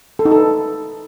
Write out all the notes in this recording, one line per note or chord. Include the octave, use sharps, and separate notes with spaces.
A4
D#4
A4
B4